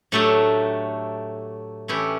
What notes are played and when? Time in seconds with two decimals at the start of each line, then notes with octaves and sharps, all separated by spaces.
0.12 A2 F#3 A3 D4 G4
1.88 E3 A3 C#4 E4 G4